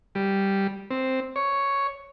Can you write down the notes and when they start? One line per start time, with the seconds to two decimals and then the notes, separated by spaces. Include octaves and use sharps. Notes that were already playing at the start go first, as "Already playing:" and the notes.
0.15 G3
0.91 C4
1.36 C#5